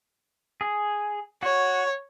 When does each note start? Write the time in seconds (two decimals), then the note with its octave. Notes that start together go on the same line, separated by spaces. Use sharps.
0.61 G#4
1.43 F#4 C#5